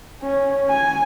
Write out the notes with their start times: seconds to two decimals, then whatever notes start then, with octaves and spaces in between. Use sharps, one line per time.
0.22 C#4
0.69 G#5